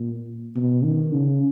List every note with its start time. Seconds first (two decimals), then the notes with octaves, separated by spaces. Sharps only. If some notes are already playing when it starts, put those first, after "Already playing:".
Already playing: A#2
0.56 B2
0.84 D#3
1.14 C#3